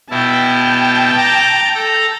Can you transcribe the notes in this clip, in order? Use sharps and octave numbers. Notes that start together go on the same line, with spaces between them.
B2 E4 G5 A5
A#5 D6
A4 A#5